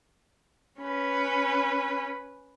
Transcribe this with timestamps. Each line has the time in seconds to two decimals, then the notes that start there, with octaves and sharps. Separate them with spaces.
0.81 C#4 B4